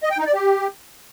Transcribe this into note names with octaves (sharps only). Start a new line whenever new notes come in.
D#5
G5
D#4
D5
G4